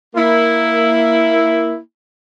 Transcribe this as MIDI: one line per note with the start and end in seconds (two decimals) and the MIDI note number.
0.15 1.78 58
0.15 1.78 64